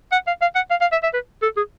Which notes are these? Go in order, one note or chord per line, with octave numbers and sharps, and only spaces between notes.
F#5
F5
F5
F#5
F5
F5
E5
E5
B4
A4
G#4